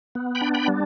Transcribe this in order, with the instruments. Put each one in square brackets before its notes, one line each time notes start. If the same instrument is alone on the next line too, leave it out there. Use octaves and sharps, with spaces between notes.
[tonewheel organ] B3
G5 B5
D4
G5 B5
G3